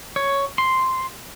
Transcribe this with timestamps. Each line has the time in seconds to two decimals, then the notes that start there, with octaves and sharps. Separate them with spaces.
0.16 C#5
0.58 C6